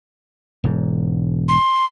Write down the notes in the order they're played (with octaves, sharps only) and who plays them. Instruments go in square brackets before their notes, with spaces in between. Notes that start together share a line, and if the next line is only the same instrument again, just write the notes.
[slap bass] E1 G#2
[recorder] C6